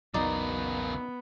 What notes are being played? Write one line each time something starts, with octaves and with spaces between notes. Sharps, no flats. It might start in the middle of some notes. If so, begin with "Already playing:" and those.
A#1 E2 C#3 F#3 B3 D#4 A#4 D5